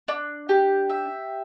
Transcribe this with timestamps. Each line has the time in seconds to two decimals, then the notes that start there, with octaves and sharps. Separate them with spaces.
0.08 D4
0.49 G4
0.90 E5